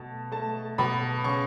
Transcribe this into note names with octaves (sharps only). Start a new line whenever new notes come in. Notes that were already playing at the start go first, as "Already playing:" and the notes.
Already playing: B2 A3 A5
A3 A5
B2 B5
C#3 C#6